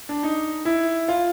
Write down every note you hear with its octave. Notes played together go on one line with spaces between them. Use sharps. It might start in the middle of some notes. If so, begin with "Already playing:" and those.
D4
D#4
E4
F4